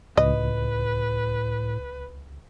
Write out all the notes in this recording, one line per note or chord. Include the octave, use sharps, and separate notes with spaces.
C#2 A2 B4 D#5